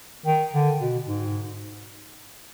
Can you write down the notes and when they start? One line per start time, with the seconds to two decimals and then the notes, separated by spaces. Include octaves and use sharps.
0.26 D#3
0.53 D3
0.79 B2
1.05 G#2